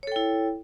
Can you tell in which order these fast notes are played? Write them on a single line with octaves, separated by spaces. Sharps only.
C#5 A4 G5 E4